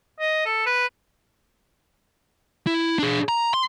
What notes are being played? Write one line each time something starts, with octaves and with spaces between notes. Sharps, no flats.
D#5
A4
B4
E4
D4 G#4
A#5
C6